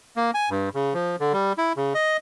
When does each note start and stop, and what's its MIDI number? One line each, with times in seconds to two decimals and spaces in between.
0.17 0.31 58
0.34 0.49 80
0.50 0.69 43
0.74 0.94 49
0.94 1.16 53
1.20 1.33 50
1.33 1.53 55
1.58 1.73 64
1.77 1.93 49
1.95 2.17 75